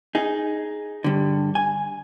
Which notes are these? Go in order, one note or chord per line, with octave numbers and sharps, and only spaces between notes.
D#4 G#4
G2 D3
G#5